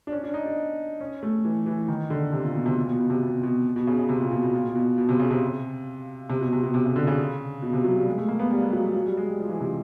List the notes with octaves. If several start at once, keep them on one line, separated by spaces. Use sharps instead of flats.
D4
C#4
D4
D#4
D4
C#4
A3
E3
E3
D#3
D3
C3
A#2
B2
C3
A#2
B2
B2
C3
B2
B2
B2
C#3
C#3
C3
A#2
B2
B2
A#2
B2
B2
B2
C3
C#3
C3
C3
B2
C3
B2
C3
C#3
D3
C#3
B2
C3
F#3
G3
G#3
A3
A#3
B3
G3
G#3
F#3
F#3
G3
G#3
G3
F3
E3
C3